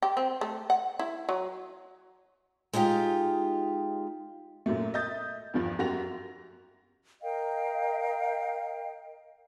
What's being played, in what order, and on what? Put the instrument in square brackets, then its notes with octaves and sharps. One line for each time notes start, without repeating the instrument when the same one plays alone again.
[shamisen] G4
C4
A3
F#5
E4
F#3
[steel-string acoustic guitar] G#3 D#4 F4 G4 F5
[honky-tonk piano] F#2 A#2 F#3 A3
D#5 E5 G6 A6
E2 G2 F3
F#2 F#4 G4 A#6 F7
[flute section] A#4 D#5 F5 G5